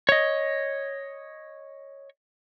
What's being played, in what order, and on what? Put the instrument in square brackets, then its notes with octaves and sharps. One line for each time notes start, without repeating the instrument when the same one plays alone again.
[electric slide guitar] C#5 D#5